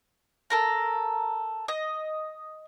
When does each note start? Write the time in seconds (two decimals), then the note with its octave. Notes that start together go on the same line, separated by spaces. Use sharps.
0.50 A4 A#4 A#5
1.68 D#5